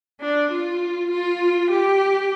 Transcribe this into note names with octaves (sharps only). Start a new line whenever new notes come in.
D4
F4
F4
G4